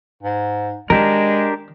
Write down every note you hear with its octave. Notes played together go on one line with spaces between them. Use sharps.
G#2
D#3 G#3 D4 G4 A#4